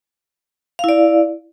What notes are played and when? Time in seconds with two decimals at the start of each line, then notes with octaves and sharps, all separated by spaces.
0.79 F5
0.84 E4
0.89 D5